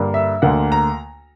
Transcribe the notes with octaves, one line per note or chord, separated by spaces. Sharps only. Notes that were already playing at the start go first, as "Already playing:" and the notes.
Already playing: G2 D3 G3 A#3
E5
D2 D3 A#3 F#5
A#5